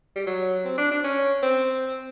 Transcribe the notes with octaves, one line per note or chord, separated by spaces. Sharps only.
G3
F#3
C4
D4
D4
C#4
C4